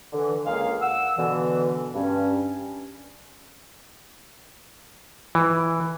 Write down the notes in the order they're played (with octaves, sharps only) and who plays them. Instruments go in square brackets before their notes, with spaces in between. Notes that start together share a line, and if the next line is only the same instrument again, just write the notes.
[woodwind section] D3 E3
C#2 G#3 A#3 G#4 F5
F#5 E6
B2 D3 E3
G2 C#4
[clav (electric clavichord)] E3